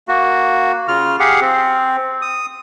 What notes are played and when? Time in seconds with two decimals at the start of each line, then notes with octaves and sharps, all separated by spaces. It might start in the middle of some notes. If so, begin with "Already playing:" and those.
0.08 A#3 F#4
0.88 C#3 F4 F6
1.20 G4 G#4 F5 F#5
1.41 C4
2.22 D#6